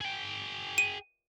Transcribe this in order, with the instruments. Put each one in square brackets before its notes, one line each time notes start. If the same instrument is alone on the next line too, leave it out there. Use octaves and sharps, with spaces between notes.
[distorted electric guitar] G#4 G5
[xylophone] D#7